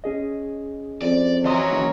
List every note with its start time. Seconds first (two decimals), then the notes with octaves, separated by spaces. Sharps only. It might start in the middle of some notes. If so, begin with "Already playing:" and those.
0.04 C#4 G#4 D#5
1.02 F2 D5
1.45 E3 F#3 C#4 D#5 A#5 C6 D#6
1.72 F#1